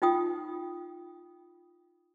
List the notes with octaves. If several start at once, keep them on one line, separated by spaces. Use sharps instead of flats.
D#4 F4 G5 D#6